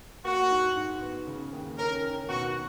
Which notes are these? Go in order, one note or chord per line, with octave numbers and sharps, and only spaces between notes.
A#3 F#4
G#2
G#2
B3
C#3
D#2
C#4 A#4
D#3
B2 F#4